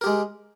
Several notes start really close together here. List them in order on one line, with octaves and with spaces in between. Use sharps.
A#4 G4 G#3